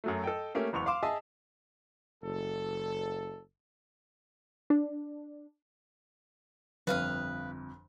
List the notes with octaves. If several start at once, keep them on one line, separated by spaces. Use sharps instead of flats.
F#2 F#3 A3
A4 D#5 G5
A3 A#3 C#4 G4
F#1 E2 C#6 F7
F5 C6 D6 E7
G#4 D#5 E5 G#5 A5
F#1 A4
D4
G1 F2 B4 F5 D#6